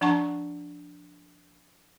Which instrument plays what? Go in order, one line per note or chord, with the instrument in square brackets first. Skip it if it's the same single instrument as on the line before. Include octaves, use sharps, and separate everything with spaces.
[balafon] F3 D4 F#5 A5 A#5 C#6